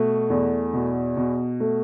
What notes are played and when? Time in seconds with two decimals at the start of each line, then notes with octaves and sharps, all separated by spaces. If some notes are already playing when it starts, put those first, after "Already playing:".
Already playing: B2 A3
0.30 E2
0.73 B2
1.17 B2
1.60 A3